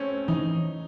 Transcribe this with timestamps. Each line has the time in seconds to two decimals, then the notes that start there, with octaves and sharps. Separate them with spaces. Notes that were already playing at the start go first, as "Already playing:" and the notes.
Already playing: A3 C4 C#4
0.28 E3 D#4